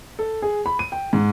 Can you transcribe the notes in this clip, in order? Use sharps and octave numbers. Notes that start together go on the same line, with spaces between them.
A4
G#4
B5
D#7
G5
G#2